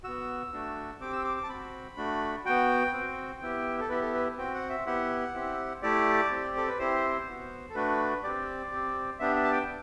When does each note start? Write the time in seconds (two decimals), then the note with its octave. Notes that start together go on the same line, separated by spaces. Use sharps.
0.04 B3 F#4 E6
0.53 A3 D4 F#4
1.01 C4 G4 D6
1.13 E6
1.24 D6
1.37 D6
1.43 A5
1.49 C4 F#4 B5
1.97 A3 D4 F#4
2.45 B3 F#4 G5
2.93 C4 F#4
3.42 B3 E4 G4
3.80 A4
3.89 B3 E4 G4 B4
4.02 A4
4.14 B4
4.37 C4 F#4 G5
4.54 F#5
4.70 E5
4.86 B3 E4 G4 F#5
5.34 C4 E4 G4
5.82 A3 E4 G4 D5
6.31 C4 G4
6.57 A4
6.68 B4
6.79 C4 E4 G4 C5
7.27 B3 F#4
7.70 A4
7.75 A3 D4 F#4 B4
8.24 C4 G4 D5
8.72 C4 G4
9.19 B3 D4 G4 E5
9.36 E5
9.44 A5
9.52 G5